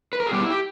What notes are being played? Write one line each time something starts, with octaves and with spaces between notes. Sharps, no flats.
B4
A#4
G#4
B2 G3 B3 G4
E4
G4